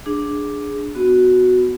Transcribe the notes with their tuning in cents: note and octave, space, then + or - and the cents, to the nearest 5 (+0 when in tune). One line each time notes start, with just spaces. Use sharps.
D4 +0 G#4 +0
B3 +20 F#4 +0